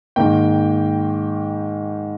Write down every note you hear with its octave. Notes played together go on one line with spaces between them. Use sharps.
G#2 D#3 A#3 G5